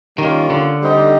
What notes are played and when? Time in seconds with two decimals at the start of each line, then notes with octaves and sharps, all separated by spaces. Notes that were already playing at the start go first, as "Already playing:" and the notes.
0.18 D#3 G3 A#3 C#4 F4
0.50 D3
0.82 G3 C4 D#4